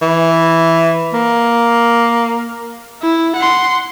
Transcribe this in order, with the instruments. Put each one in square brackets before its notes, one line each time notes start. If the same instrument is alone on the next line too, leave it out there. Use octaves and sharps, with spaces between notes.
[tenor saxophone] E3
A#3
[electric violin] E4
F#5 C6